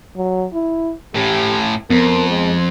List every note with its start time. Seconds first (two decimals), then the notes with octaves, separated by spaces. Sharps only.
0.17 F#3
0.54 E4
1.15 A2 C#4 G4
1.90 F2 B3 A#4
2.29 G#3